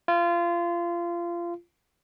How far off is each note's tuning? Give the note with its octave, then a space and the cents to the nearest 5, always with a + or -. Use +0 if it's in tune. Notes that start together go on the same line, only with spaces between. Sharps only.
F4 -25